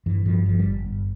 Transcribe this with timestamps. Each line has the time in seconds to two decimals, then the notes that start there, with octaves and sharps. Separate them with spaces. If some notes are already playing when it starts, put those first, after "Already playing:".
0.06 G2 E3
0.25 G2 F3
0.46 G1 F3
0.59 G3
0.66 G1
0.86 G2